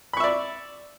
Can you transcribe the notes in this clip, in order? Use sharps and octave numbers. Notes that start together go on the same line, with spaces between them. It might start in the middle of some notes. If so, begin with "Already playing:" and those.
D5 E5 B5 C#6